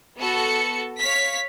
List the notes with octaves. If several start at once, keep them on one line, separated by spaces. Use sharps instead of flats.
B3 F#4 A4 C#7
C#5 F5 B6